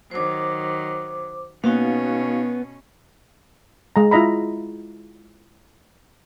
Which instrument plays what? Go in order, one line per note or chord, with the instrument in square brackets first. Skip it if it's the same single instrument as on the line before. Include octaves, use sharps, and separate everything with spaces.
[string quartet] D#3 F#3 [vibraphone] C5 D6
[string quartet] B2 C#4 [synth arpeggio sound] A#3 [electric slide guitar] B3 [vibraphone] D#4 F#4 F5
[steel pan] G#3 A#5
E4 F4 D#5 A#5 B5